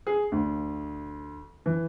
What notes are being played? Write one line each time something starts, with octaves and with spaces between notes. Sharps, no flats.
G#4
D2
E3